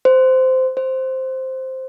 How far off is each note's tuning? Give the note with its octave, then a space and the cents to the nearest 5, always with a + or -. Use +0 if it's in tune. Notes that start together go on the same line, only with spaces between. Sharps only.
C5 -15
C5 +0